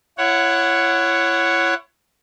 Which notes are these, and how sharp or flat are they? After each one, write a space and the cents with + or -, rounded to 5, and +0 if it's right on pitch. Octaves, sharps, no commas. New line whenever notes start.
E4 +30 C#5 +0 F#5 +0